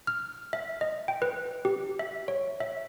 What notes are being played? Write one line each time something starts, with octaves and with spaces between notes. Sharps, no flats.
F6
E5
D#5
G5
B4
G4
E5
C#5
E5